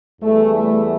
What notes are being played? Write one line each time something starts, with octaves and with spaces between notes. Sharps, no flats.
E2 E3 G3 A3
A3